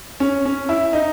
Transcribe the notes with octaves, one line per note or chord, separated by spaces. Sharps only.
C#4
C#4
E4
D#4